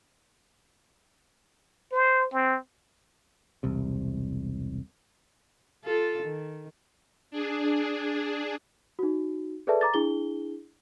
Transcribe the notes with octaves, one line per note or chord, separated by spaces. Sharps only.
C5
C4
E1 C2 C3
F4 A4
D#3
D4 G#4
D#4 F#4
G#4 A4 B4 D5 E5 A5
A#5 D6 A6
D4 E4 G#4 G7